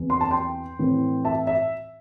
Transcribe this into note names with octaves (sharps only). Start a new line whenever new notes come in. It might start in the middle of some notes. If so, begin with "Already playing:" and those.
Already playing: E2 E3 C4
C6
A5
G5 C6
A2 E3 C4
E5 A5
E5